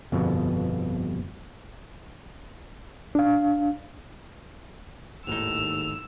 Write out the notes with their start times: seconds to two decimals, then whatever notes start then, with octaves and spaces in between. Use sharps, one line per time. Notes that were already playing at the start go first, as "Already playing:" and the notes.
0.12 G1 F2 B2
3.15 D4 F5
5.27 G#1 D#2 A2 D#4 E6 F7